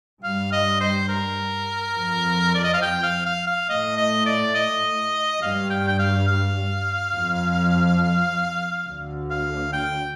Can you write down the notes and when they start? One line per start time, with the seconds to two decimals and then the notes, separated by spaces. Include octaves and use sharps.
0.23 G2 G3 F5
0.52 D#5
0.81 C5
1.09 A#4
1.96 F2 F3
2.55 D5
2.64 D#5
2.74 F5
2.82 G5
3.03 F5
3.26 F5
3.47 F5
3.69 A2 A3 D#5
3.97 D#5
4.26 D5
4.55 D#5
5.41 G2 G3 F5
5.70 G5
5.88 G5
5.99 F5
6.28 F5
7.14 F2 F3
8.87 D2 D3
9.30 F5
9.73 G5